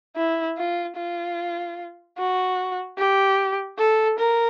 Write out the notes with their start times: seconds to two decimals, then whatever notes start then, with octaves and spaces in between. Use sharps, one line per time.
0.16 E4
0.58 F4
0.97 F4
2.18 F#4
2.98 G4
3.79 A4
4.19 A#4